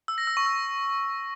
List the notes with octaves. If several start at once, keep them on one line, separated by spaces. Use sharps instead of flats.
E6
A#6
E6
C#6
E6